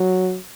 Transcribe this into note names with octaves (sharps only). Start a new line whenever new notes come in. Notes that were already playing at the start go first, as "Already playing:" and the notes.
Already playing: F#3